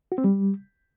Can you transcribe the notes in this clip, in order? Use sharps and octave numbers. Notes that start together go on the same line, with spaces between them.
F#4
C4
G3